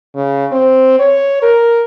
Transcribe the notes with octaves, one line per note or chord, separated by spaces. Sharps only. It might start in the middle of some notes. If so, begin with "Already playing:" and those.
C#3
C4
C#5
A#4